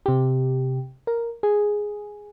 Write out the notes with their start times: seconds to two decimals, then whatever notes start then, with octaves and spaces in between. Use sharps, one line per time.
0.06 C3 G4
1.07 A#4
1.43 G#4